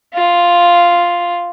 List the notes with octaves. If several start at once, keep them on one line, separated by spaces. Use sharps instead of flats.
F4